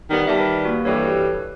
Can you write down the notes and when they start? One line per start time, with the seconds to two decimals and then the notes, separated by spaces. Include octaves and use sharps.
0.09 D#3 G3 B3
0.27 D#3 G3 E5 A5
0.40 B4
0.65 A#3 F#4
0.85 G2 E3 G3 A4 B4 C#5